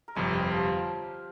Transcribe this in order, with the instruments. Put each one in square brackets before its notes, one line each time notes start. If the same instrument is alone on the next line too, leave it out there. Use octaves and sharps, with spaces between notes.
[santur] A#4
[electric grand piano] G1 F2 C3 [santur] G#3 G#4
[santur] G3 G4
F3 F4